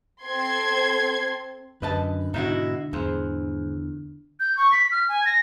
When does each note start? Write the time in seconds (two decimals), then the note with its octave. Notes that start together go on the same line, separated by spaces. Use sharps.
0.25 C4 A4 C6 G#6
1.82 F#2 D3 B4 D#5 A5
2.34 G#2 B2 D#4 E4 F#4
2.93 E2 G#2 C5
4.40 G6
4.57 C#6
4.72 B6
4.92 F6
5.09 G#5
5.26 A#6